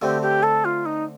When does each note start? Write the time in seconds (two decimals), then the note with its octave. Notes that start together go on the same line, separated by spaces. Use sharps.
0.01 D3 A3 C4 G4
0.21 G4
0.42 A4
0.64 F4
0.85 D#4